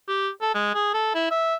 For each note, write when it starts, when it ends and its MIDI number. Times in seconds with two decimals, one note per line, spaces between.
0.08 0.29 67
0.41 0.54 69
0.55 0.74 56
0.75 0.92 68
0.94 1.14 69
1.15 1.28 64
1.31 1.55 76